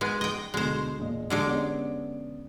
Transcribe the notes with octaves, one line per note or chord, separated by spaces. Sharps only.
G#3 B3
D#5 G5
D2 B2 G#3 A3 C5
E1 A#2 D#5
D3 G#3 G4 D7
B3 C#4 D5